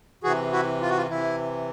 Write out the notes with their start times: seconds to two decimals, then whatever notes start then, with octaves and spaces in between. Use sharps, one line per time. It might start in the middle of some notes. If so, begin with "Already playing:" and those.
0.24 C3 E3 F#4 G#4
0.52 E4 F#4
0.82 F4
0.90 F#4
0.97 F4
1.10 C3 E3 E4